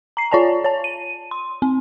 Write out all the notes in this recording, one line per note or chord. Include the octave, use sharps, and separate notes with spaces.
A#5 C7
F4 C#5 D5 G#5 A5
C#5 A5
D#7
C6
C4